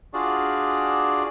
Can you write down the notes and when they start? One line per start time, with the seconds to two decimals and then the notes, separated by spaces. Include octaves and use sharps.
0.14 D4 F4 F#4 G#4 D5